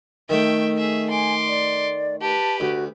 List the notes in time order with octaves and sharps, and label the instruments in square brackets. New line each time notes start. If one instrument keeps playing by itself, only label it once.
[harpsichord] D#3 A3 [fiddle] E5 G5
[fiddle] G#4 E5
[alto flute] G#5 [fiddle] C6 D6
[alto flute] D5
[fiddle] G4 B4 [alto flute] A5
[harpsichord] D2 [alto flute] F#4